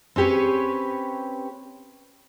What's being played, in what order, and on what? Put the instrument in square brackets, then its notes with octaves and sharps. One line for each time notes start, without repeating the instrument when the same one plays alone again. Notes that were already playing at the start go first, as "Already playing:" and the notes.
[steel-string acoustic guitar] C4 C#4 G4 B4 C#5